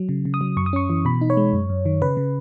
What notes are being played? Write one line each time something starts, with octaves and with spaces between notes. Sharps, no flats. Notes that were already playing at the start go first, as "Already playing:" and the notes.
Already playing: F#3
C#3
C#3
D#6
F#3
F#2 C#6
D#6
C#4 C#6
E3
B2 B5
D#4
C#5
G#3
F#2
F#2
D#3
C#3 B4
C#3